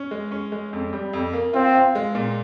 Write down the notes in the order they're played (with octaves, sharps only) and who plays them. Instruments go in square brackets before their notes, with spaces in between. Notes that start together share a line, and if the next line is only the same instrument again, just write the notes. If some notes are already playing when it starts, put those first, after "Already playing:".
Already playing: [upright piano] C#4
G#3
C#4
G#3
F2
G3
F2
A#3
[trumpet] C4 [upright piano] F4
[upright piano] F4
G#3
A#2